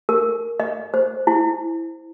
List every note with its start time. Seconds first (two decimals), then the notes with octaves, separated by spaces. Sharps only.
0.09 A#4
0.60 D#5
0.94 C5
1.27 E4